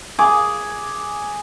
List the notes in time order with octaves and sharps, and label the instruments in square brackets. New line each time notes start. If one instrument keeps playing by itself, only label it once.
[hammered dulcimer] G#4 D6